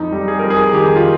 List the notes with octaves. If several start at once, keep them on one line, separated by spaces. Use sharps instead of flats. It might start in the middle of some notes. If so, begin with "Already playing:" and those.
Already playing: F2 D#4
G3
G#4
F2 A#4
G#4
D#3 G4
F4